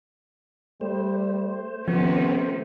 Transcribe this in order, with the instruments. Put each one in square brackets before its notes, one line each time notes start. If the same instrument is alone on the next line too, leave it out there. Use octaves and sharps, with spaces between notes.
[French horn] G3 [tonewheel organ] A3 C5
[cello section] C3 D#3 C#4 [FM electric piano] F3 [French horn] B3